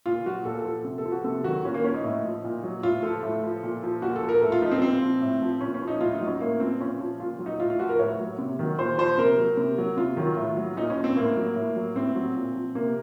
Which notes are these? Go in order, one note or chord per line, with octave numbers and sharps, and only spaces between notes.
A#2 F4
F#3 F#4
A#2 A4
A4
F3
C3
A4
F3
F#4
C3 A4
D#3 F#3 F#4
A#2 C#4
A#3
F3 C#4
D#4
A2
F3
A#2
F#3
A2 F4
F3 A4
A2
F3
A#2
F3
A#2 F#4
A4
F3
A#4
A2 A4
F4
F3 D#4
C4
A#2 C4
F3
A2
F3
A#2 C#4
C#4
F3
D#4
A2 F4
D#4
F#3
C#4
A2 A#3
F3 C4
A#2 C#4
F3
A#2 F4
F#3
D#4
A2 F4
F4
F3 F#4
A#4
A2 C#5
F#3
C3
D#3 F#3
A#2 C5
F3 C5
C3 A#4
F#3
C3
F#3
C3 F4
D#3 F#3
A2
F#3
A#2 D#4
C#4
F3
C4
A2 A#3
F#3
A2
F#3
A2 C4
F#3
A#2
F3
C3 A#3